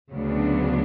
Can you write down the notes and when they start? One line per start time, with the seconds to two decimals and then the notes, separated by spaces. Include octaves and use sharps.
0.12 D2 C#3 F#3 B3 D4